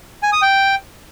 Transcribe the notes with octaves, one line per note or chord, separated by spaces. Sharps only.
G#5
D#6
G5